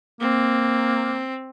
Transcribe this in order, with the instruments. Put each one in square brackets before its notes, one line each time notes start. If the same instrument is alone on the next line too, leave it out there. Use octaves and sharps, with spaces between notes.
[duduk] A#3 [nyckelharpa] C4